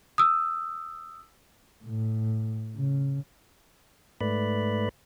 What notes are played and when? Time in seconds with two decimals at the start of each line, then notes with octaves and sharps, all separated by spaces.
0.18 D#6 E6
1.84 A2
2.77 C#3
4.21 G#2 A3 B4 D5 B5